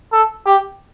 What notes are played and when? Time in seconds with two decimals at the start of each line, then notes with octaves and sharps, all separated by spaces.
0.12 A4
0.46 G4